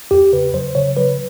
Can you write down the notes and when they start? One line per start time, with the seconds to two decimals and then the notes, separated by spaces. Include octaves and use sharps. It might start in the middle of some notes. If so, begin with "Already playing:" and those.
0.11 E2 G4
0.33 C#3 B4
0.54 F#3 C5
0.75 C#3 C#5
0.97 F#3 B4